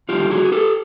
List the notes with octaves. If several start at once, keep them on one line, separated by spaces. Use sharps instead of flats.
F2 D3 G3 F4 G4
F#4 G#4
G#4
G4 A4